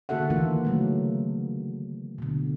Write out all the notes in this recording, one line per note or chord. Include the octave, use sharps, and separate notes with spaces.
D3 A#3 F#4 A4 E5 F#5
D#3 E3 A#3 D4 F4
C#3 F#3 A3
B2 D3